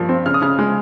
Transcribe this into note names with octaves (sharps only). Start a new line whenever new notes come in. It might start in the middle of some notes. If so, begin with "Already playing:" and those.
Already playing: G2 F3 A#3
C4
C#3 F6
D#6
C#3 F6
G#3